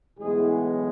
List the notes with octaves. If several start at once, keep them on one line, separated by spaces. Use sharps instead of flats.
B1 A2 E3 G#3 B3 G#4